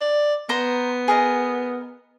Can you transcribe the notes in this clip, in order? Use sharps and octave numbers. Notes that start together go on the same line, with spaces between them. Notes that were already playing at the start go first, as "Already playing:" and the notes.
D5
B3 C5 A#5
G#4 A#4 D#5